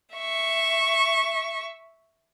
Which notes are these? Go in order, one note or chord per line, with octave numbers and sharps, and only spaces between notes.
E5 C#6